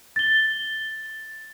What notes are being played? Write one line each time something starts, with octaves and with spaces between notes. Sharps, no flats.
A6 G7